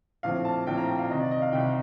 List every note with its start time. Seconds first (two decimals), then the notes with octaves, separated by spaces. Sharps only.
0.23 A#1 A2 F3 C4 F5
0.45 A5
0.67 A#1 A2 F3 C4 G5
0.77 A#5
0.88 G5
0.99 F5
1.10 C2 C3 D#3 D#5
1.20 D5
1.31 D#5
1.42 F5
1.52 C2 C3 D#3 G5